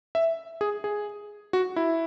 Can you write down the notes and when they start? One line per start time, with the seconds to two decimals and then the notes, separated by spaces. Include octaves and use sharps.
0.15 E5
0.61 G#4
0.84 G#4
1.53 F#4
1.76 E4